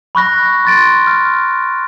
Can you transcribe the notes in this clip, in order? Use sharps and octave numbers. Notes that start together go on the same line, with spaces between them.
B5 C#6 F#6 A#6
C6 A6 D7
F6